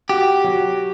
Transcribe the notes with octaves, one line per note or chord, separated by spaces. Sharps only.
F#4 G4
F#3